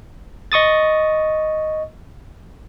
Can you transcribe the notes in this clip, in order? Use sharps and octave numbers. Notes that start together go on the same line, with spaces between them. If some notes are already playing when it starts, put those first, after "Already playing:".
D#5 C#6 D#6 A6